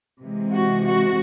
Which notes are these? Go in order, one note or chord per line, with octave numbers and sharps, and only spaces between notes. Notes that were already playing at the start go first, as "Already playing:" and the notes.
C3 E3 G#3
F#4
F#4